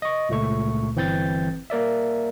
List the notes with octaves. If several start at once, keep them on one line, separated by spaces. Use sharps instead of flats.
D#5 C#6
C#2 A#2 A3 C#6
G1 E3 C4 G6 A6
A#3 A#4 D5 E5